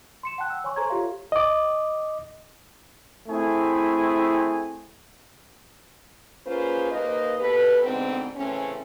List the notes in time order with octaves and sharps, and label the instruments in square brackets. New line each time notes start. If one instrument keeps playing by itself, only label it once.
[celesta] C6 C#7 E7
F#5 G5 A5 F#6
E6
C#5 G#5 C6 C#6
A4 C5 A#5 C6 C#6 G#6
F4 G4 A4 C#5 E5 F5
[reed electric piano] D#5 D6
[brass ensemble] A3 C4 E4 G#4 G#5
[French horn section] A#3 C#4 F4 G#4 B4 C5
D#2 A#3 B4 C5 D#5
B2 G4 A4 B4
G#2 B2 D3 B3 C4
A2 C#3 E3 C4 C#4